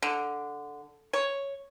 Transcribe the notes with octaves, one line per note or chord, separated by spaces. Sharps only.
D3
C#5